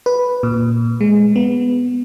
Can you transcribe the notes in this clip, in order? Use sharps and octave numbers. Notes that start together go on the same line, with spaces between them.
B4
A#2
G#3
B3